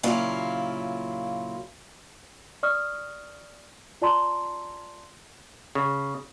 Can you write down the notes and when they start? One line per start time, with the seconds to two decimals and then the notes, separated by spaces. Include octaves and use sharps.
0.03 A#2 C#3 F#3 A#3 E4 F4
2.63 D5 C#6 D#6 F6
4.02 F4 D5 A5 A#5 C6
5.75 C#3